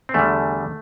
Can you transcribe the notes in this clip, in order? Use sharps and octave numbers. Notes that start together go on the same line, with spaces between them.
C4
E2 D3 G3 A3